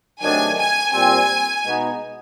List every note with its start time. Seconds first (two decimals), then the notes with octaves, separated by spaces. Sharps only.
0.22 C3 D#3 F#3 A3 D4 G#5
0.58 G#5
0.92 A#2 G3 C4 G#5
1.63 B2 G#3 B3 D#4 F#4